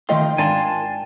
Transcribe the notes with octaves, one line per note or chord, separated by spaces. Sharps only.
D#3 A3 F4 D#5 G5 C6
G#2 D4 F4 A#4 G#5 A5 C6